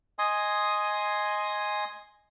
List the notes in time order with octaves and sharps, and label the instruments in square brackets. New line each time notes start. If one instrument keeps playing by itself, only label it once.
[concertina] D#5 G#5 C6 D#6